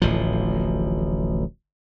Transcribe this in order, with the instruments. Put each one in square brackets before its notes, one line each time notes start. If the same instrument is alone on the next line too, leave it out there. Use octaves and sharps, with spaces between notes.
[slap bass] D1 A1 F3